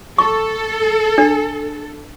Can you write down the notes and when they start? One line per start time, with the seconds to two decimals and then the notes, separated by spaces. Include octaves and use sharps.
0.18 A4 C#6
1.18 D4